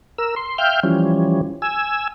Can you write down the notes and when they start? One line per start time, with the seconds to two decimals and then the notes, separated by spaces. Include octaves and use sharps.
0.18 A#4 E6
0.36 C6
0.58 E5 F5 G5 F6 G6
0.83 E3 F3 G3 C#4
1.62 G#5 E6